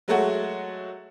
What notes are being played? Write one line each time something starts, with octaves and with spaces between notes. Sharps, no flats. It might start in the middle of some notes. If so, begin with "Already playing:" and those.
F#3 G#3 A3 F#4